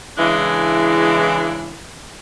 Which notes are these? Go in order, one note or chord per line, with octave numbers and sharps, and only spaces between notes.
C#3 E3 G#3 D4 E4